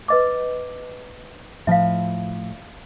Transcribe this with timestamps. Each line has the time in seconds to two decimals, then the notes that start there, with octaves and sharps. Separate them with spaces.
0.08 B4 D#5 D6
1.67 A2 F3 E5 F5